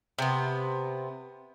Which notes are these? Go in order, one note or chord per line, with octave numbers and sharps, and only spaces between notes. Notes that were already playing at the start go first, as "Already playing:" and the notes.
C3 B3